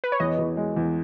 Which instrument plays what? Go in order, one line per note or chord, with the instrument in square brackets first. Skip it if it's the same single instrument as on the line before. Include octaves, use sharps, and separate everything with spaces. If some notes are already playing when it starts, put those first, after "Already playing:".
[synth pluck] B4
C#5
[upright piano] E2 [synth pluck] D#5
[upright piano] E2
G#3
E2